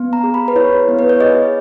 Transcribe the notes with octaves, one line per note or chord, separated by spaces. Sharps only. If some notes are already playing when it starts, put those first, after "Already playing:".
Already playing: B3
A#5
G#4
B5
B4
E4 C#5
B3
B4
C#5
G#4 D#5